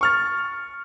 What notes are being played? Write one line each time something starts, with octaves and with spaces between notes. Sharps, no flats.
C#6 F6 A6